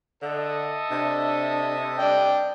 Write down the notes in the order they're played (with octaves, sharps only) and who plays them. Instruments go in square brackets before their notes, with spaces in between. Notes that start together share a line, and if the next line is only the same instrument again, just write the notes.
[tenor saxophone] D3 [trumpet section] A4 D#5 E5
[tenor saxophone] C3 [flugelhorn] D4
[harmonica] D4 G5 [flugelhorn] D5